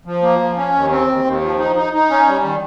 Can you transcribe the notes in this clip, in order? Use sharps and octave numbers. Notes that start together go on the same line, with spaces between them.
F3
A#3
F3
C#4
D#2
C4
D#2
D#2
F3
D#4
D#4
D#4
C#4
G3
D#3